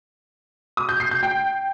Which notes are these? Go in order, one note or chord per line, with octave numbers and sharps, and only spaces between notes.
D#6
G6
C7
G6
G5